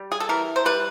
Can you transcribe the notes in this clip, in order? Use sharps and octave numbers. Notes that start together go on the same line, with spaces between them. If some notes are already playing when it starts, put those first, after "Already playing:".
Already playing: G3
G#4
A4
E3 A#4
C5
G3 B4